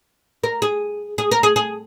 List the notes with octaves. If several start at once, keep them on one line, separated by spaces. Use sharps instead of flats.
A#4
G#4
G#4
A#4
G#4
G#4